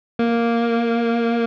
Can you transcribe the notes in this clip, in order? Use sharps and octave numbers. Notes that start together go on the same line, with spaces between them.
A#3